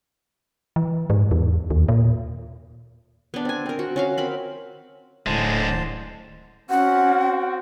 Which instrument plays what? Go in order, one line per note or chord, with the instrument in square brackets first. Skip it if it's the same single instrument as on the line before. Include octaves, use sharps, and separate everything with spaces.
[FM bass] E3
G#2
E2
D#2
A#2
[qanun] B3 D4
C4 G#5
C4 A#4
F#4
C#4 F#4 F5
C4 A#4 B5
[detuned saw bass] D1 [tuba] A2 [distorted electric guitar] D3 G#3 [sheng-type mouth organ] C5 A5
[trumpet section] C4 F#4 [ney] C#4 [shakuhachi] F#5